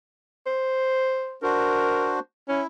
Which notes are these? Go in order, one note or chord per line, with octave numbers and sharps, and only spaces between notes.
C5
D4 F#4 A#4 C5
C#4 E4